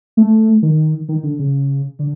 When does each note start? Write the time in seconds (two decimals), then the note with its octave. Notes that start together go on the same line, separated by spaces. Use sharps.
0.17 A3
0.62 D#3
1.09 D#3
1.23 D3
1.39 C#3
1.99 D3